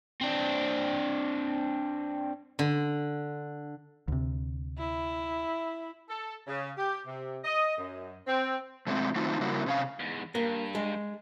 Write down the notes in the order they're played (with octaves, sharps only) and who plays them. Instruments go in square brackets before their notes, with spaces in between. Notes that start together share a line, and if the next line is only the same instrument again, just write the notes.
[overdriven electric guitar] C4 D4
[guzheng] D3
[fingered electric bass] D2 C3
[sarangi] E4
[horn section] A4
C#3
G4
C3
D#5
F#2
C4
[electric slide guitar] B2 G#3 A3 B3 C4
D#3 A3 C4 D#4 F4
C#3 G3 A#3 E4 F#4
C3 C#4 F5
[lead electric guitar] E2 G#2
[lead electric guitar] G2 [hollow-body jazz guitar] A#3
[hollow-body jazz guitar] G#3